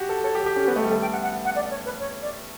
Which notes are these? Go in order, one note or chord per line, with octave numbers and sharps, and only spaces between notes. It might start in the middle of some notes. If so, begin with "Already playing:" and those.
Already playing: F#4 G4
A4
A4 C#5
G4
A4
G4
C#4
G4
B3 F#4
A3
G4
G3
A3 A4
G5
F#5
F#5
F#5
D5
C#5
B4
C#5
D5